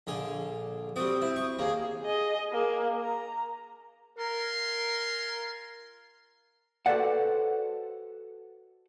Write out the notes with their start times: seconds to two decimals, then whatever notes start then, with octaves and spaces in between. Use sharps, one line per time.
0.07 A#1 D3 G#4
0.96 G3 C4 F#4 D#6
1.22 E4
1.36 C#6
1.59 D#2 A#3 G#4
2.03 G#4 D#5
2.52 A#3 G#4
3.00 A#5
4.19 F4 A#4 G#5 C6
6.86 F#4 A4 B4 C5 D5 F#5